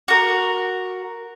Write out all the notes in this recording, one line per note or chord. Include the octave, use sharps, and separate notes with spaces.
F#4 A#4